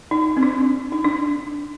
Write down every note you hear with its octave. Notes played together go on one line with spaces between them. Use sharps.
D#4
C4
D4
D#4
D4